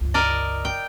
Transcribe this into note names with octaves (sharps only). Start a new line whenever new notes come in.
G1 C#2
A#4 D5 D#5
G5